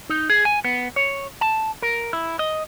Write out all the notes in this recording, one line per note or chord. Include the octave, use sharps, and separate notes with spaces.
D#4
G#4
G#5
B3
C#5
A5
A#4
E4
D#5